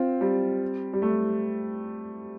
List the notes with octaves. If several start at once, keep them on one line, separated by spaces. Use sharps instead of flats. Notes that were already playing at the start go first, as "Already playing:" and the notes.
Already playing: C4 F4
G3 C4
G3
A3